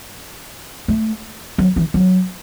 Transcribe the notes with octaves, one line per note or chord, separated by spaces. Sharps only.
A3
F#3
E3
F#3